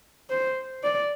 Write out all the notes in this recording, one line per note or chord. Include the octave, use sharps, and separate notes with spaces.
C5
D5